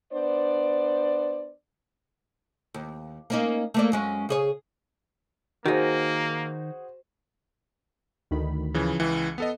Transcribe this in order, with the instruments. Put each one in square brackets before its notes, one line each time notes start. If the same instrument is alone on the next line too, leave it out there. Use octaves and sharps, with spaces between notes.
[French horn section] B3 D4 C5 D5
[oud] D#2
A#3 C#4 D#4
A3 A#3 D5
F#2 G#3 C#4
C#3 G#4 C#5
[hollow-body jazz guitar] D#3 D#4 [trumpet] A#3 [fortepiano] F#4 G#4 C5
[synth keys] D2 D#3 B5
[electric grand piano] C#3 E3 F3
[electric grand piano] C#2 E3 [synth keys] C#7
[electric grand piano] B3 A4 D#5